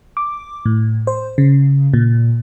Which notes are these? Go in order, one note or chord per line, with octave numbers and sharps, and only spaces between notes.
D6
A2
C5
C#3
A#2